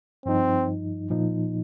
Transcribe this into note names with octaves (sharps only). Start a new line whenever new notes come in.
G2 F3 C4 D#4
A#2 F3 D#4